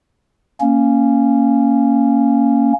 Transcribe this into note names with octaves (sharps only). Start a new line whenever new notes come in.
A#3 C#4